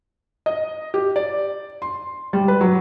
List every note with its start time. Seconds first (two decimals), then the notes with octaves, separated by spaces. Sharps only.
0.46 D#5
0.94 G4
1.16 D5
1.82 C6
2.33 G3
2.48 B4
2.61 F#3